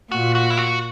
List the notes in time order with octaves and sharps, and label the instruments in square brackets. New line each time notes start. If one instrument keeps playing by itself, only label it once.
[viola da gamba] A#2 [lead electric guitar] F#4
[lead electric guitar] F#4
E4
F#4